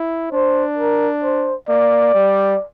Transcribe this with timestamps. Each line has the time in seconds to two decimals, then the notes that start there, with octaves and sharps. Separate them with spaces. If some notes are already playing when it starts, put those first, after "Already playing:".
Already playing: E4
0.32 D4 C5
0.78 A#4
1.23 C5
1.69 A#3 D5
2.15 G3